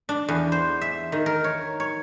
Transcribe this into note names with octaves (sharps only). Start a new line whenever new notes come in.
D4
E2
C5
E5
D#3
A#4
C#5
C#5